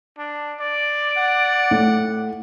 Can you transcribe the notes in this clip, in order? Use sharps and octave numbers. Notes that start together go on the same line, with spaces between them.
D4
D5
F#5
A2